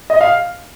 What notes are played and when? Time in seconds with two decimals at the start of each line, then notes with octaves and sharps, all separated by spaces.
0.10 D#5
0.21 F5